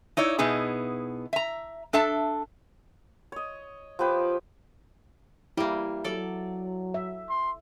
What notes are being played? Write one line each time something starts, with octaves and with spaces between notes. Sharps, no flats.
D#4 E4 C#5 D5
B2 B3 D#4 E4 G#4
E5 A#5
D4 A4 E5 A5
C#5 D#5
F3 G4 B4 G5
G3 A#3 E4
F#3 A4 D5
E5
C6